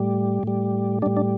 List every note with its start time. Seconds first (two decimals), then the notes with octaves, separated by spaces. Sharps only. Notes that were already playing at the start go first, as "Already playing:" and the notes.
Already playing: A2 G3
0.43 A2 G3
1.02 A2 G3 D4
1.17 D4